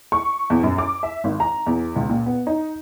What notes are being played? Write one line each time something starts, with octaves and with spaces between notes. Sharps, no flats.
C#6
E2
F#2
D6
E5
G#1
A#5
E2
C#2
A#2
B3
D#4